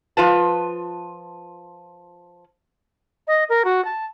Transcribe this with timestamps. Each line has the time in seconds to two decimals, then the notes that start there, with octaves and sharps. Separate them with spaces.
0.17 F3 F4 B4 A5
3.27 D#5
3.49 A#4
3.65 F#4
3.85 A5